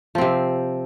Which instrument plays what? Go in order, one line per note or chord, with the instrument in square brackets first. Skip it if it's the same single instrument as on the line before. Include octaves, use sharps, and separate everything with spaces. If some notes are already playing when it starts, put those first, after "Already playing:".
[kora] F3
C4
C3